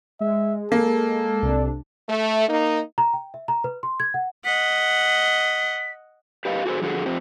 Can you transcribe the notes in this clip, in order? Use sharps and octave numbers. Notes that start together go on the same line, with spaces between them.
G#3 E5
A#3 A4
C2 C3 D4
A3
A#3 D#4
A#5
G5
E5
A#5
B4
C6
G#6
F#5
D#5 F#5 B6
G4 B4 D#5 F5
F#4 G#4 A4 C5
F2 D3 F#4 G#4 A4
F2 C4 G4